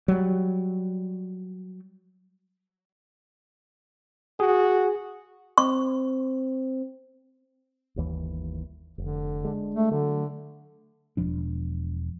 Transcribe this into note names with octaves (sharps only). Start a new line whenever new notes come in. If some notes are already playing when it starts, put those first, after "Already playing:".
F#3 G3
F#4 G#4
C4 C#6
G1 D#2 E3
F1 D3
G#3 D4
A3
D3 F#3 A3
E1 F3 D4